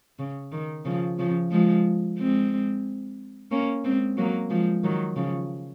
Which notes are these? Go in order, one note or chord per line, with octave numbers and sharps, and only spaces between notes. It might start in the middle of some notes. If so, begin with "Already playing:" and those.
C#3
D#3
C#3 F3
C#3 F3
F3 G#3
G#3 C4
A#3 C#4
G#3 C4
F#3 A#3
F3 G#3
D#3 F#3
C#3 F3